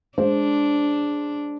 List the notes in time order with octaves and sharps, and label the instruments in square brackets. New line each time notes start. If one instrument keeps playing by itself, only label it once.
[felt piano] G#3 C5 [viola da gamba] D4